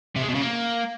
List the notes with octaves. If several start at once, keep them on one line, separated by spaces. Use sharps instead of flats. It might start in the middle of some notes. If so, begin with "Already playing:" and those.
C3
G#3
B2
C#3
A#3